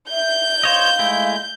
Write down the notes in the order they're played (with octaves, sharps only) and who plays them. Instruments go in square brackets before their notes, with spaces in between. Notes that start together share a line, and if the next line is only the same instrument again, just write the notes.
[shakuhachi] E5 [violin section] G6
[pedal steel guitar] C5 C#5 D#5 [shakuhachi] F5
[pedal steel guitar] G#3 A3 E4